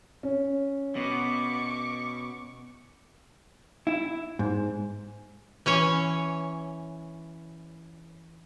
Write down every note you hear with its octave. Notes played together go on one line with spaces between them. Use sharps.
C#4
B2 C#6 D6
E4
G#2
E3 C#4 C#5